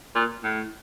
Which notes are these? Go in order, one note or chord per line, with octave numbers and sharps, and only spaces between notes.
A#2
A2